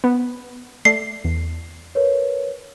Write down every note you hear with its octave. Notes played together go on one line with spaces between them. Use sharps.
B3
A3 D5 C7
E2
A#4 B4 C#5